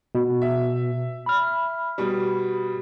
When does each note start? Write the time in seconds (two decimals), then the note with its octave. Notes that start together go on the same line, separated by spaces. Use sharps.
0.15 B2
0.42 E5
1.26 B5 F6
1.98 B2 G3